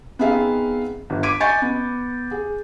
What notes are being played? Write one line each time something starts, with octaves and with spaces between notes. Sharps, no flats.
B3 C4 D#4 G#4 E5 F5
G1
D6 G#6 B6 D7 D#7
D#5 G#5 C#6 G6 A6 C#7
B3
G#4